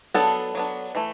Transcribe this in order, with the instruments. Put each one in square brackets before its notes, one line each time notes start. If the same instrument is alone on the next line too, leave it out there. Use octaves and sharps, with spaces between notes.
[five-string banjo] F#3 B3 D4 A4
F#3 B3 D4
E3 A3